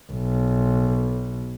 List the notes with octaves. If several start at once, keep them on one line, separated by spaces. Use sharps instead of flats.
B1